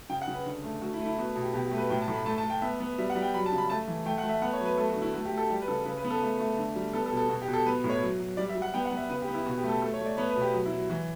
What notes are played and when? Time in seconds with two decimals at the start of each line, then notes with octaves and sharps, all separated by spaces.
0.09 C#3 G5
0.22 F#5
0.28 C#3
0.33 B4
0.46 D3
0.63 A3
0.82 A3 F#4
0.94 E4
1.00 A3
1.06 E4
1.18 B3 F#4
1.36 B2
1.42 G4
1.54 B2 G4
1.66 G4
1.71 A3
1.78 B4
1.90 A2 G5
2.02 A5
2.08 A2
2.14 B5
2.25 A3 A5
2.38 A5
2.43 A3
2.50 G5
2.62 B3 E5
2.80 B3
2.98 G3 E5
3.10 F#5
3.15 G3
3.22 G5
3.34 F#3 B5
3.46 A5
3.52 C#3
3.58 B5
3.70 A3 A5
3.88 E3
4.06 A3 G5
4.18 F#5
4.24 A3
4.29 E5
4.42 B3 F#5
4.54 C#5
4.60 F#3
4.65 B4
4.77 A3 A4
4.90 F#4
4.96 D3
5.02 E4
5.14 A3 F#4
5.25 G4
5.32 A3
5.38 A4
5.50 G3 G4
5.62 B4
5.68 C#3 A4
5.85 C#3 B4
5.97 B4
6.04 B3
6.10 A4
6.22 A3
6.40 A3
6.58 D3
6.75 G3
6.93 B3 A4
7.06 A4
7.12 B2
7.17 A4
7.29 B2 F#4
7.42 G4
7.48 B2
7.53 A4
7.66 B3 B4
7.84 A2
7.90 C#5
8.02 F#3
8.20 F#3
8.37 G3 D5
8.49 E5
8.55 G3
8.62 F#5
8.74 B3 G5
8.85 F#5
8.91 B3
8.97 E5
9.09 C#3 B4
9.22 G4
9.28 B3
9.34 E4
9.46 B2 F#4
9.58 G4
9.63 A3
9.69 A4
9.82 A3 A4
9.94 C#5
10.00 A3
10.06 D5
10.17 B3 C#5
10.30 B4
10.36 B2
10.42 G4
10.53 F#3 F#4
10.66 E4
10.72 F#3
10.89 E3 F#4